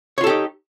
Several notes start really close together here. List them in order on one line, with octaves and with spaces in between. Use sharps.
C#5 F4 A4 G4 D#4